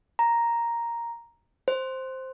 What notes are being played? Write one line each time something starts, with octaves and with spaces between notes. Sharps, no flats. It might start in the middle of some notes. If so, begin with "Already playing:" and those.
A#5
C5